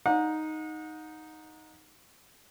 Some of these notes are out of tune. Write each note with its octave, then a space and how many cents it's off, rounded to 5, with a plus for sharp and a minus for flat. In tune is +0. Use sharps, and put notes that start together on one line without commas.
D#4 +0 F#5 -35